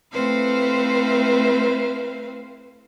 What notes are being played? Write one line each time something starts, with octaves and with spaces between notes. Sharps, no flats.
A3 C4 E4 B4 C5 F5